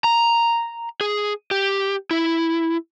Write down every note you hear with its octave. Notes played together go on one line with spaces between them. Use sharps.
A#5
G#4
G4
E4